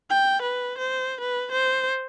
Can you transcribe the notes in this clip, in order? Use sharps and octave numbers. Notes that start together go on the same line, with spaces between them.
G5
B4
C5
B4
C5